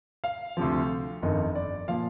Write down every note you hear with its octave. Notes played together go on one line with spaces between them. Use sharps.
F5
D2 C3 F3
G1 F2 D#3 D#5
D5
A#2 F3 F5